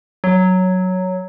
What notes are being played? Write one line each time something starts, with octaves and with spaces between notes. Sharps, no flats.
F#3